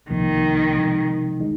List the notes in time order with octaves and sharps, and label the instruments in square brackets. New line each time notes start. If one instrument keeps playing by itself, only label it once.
[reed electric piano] C2 C3 F3 A#3 [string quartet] D#3
[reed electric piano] C3 F3 G#3 D#4
D#3 G#3 D#4